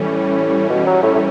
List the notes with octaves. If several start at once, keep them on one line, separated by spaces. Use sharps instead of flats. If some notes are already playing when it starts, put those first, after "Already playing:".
Already playing: A2 E3 G3 C#4
B2
F#3
A2
A2